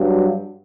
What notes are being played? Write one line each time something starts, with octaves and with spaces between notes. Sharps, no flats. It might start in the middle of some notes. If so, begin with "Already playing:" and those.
Already playing: G2 F#3